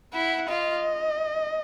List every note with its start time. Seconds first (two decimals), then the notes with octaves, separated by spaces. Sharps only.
0.14 E4 F#5
0.49 F4 D#5